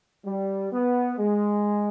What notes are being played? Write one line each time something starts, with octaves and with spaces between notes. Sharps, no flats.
G3
B3
G#3